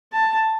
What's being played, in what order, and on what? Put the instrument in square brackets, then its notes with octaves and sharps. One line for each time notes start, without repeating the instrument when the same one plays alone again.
[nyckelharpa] A5